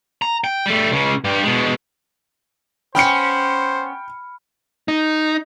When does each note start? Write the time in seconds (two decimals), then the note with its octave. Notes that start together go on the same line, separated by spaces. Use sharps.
0.22 A#5
0.44 G5
0.66 G3 A3
0.91 C#2 C#3
1.24 G2 G4
1.43 B2 G#3
2.95 B3 C#4 C5 G5 B5 F6 C#7
4.88 D#4